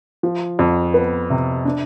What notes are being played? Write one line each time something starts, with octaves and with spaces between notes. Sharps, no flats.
F3
F2
B3
C3
D4